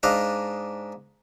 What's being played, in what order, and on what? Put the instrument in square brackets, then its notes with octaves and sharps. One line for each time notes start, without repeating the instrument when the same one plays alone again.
[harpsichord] G#2 D4 D#5 F5